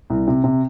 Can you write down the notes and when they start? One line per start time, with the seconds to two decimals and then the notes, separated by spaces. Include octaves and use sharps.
0.10 C2
0.28 C3
0.44 C3